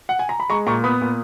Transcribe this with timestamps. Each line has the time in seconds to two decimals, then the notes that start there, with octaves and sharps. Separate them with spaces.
0.09 F#5
0.19 G#5
0.29 A#5
0.40 B5
0.50 G#3 A#5 C#6
0.67 A#2 A#5 C#6
0.84 B3 B5 D#6
1.01 A#2